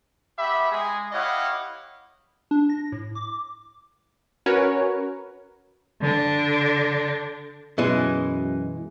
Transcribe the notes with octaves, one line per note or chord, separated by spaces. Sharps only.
B3 G4 E5 B5
G#3 G#4
E4 G4 C#5 D#5 F5 F#5
D4
A#6
A2
D6
C#4 F#4 A#4 B4 C#5
D3 D4
F#2 B2 E3 G#3